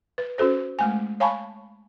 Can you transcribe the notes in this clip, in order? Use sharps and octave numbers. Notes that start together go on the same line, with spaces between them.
B4
C#4 F#4 A4 C5
G#3 A3 G#5
C#5 F5 G#5 A5 B5 C#6